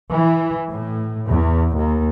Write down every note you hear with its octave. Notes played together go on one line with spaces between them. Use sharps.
E3
A2
E2
D#2